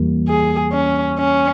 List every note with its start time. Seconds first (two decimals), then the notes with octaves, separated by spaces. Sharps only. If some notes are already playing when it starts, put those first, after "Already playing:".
Already playing: E2 E3 G3 A#3
0.28 G#4
0.72 C#4
1.19 C#4